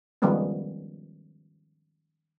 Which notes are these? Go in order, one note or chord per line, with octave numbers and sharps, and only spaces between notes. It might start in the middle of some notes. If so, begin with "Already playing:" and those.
D#3 F3 G3 G#3 B3 C#4